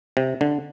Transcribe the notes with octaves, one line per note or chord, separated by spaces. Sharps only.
C3
D3